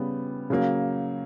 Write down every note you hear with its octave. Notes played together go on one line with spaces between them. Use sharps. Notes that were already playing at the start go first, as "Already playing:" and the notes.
Already playing: C#3 G3 B3
C#3 F#3 A#3